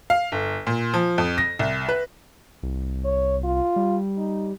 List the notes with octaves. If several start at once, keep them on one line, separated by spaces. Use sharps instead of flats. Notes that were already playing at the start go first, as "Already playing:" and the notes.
F5
G1
A#2
F3
F2
A#6
C2
B4
C2
C#5
F4
G3
D#4